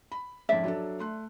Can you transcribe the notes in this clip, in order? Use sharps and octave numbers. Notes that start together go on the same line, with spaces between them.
B5
F2 G#2 C#4 D5 E5
F#3 D4 A4
A3 C6 F#6